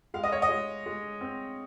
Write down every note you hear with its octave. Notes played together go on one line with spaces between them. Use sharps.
G#3 F5
D#5
C#5
D#5
G#3
G#3
C4